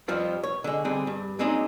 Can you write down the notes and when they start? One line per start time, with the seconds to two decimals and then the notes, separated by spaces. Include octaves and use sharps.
0.08 F2 F3 G3 C4 F4
0.43 C#5
0.64 D3 G#3
0.85 D3 G3 C4 G#4 D5
1.07 G2
1.39 F#3 G#3 A#3 C4 D4 D#4